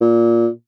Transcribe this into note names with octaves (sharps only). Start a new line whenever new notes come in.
A#2